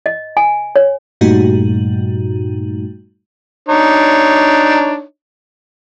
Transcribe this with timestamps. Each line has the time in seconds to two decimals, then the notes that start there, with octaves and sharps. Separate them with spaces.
0.06 D#5
0.37 G#5
0.76 C#5
1.21 G2 A#2 G3 A3 D#4 F#4
3.68 D4 D#4 C#5